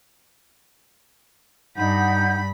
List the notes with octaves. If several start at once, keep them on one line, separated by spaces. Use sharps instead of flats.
G2 D#4 F#5 B5 G6